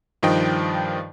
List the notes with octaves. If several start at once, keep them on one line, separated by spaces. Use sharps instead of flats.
G2 D#3 F3 D#5 G5